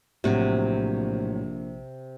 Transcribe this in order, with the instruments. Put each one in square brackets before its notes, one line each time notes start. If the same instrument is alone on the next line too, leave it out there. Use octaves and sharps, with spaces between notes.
[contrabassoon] A#1 [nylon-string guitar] A2 F#3 [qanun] C3 F#5